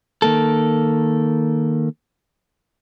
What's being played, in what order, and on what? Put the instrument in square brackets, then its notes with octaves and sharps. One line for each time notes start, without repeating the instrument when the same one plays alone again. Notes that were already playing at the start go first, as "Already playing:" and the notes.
[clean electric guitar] D#3 A#3 A4